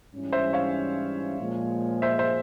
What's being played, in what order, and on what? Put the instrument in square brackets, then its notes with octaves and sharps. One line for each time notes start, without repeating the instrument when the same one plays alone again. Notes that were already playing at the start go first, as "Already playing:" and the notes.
[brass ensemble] G#2 E3 G3 C#4 E4
[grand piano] C5 E5
C#5 F5
[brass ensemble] A#2 F3 G#3
[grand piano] C5 E5
C5 E5